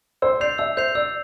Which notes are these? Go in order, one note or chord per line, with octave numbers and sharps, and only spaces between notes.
C5 E6
D5 G6 C7 F7
E5 E6
C5 G6 C7 F7
D5 E6